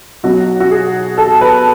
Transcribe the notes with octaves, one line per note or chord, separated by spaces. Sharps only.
B1 B2 F#3 F#4
F#4
G#4
A4
B4